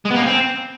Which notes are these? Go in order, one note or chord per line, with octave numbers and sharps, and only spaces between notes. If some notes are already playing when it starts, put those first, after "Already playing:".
G#3
B3
A#3
C#4
C4